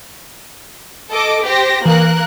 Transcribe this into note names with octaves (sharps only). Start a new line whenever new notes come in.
A4 D#5 D6
G4 C5 A#6
E3 A#3 A#4 F#6